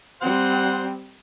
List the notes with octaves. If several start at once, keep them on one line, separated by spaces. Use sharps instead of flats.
G3 C4 C5 F#5